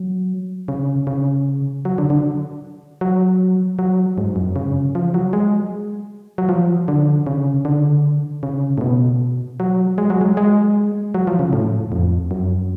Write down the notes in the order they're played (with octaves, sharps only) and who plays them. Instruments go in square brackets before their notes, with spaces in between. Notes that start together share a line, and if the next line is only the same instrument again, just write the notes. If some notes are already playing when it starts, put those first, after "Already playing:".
Already playing: [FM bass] F#3
C#3
C#3
F#3
D3
D3
F#3
F#3
G#2
F#2
C#3
F3
F#3
G#3
F#3
F3
D3
C#3
D3
C#3
A2
B2
F#3
G#3
F#3
G#3
G#3
F#3
F3
C#3
A2
F2
F#2